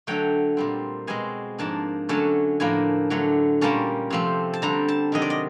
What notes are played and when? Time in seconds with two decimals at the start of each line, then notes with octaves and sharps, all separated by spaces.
0.07 D3 F#3 A3 G5
0.57 A#2 G3 C4
1.07 B2 G#3 C4 G#5
1.58 G#2 F3 A#3 D4 A5
2.09 D3 F#3 A3 C#4 A5
2.60 A2 F3 A#3 D4 G#5
3.10 D3 F#3 A3
3.61 A#2 G3 A#3 C#4 A5
4.10 C3 F3 A3 C4
4.53 A5
4.62 D3 G3 C4 A#5
4.88 A5
5.12 C3 D#3 F#3 D#5
5.22 D5
5.30 D#5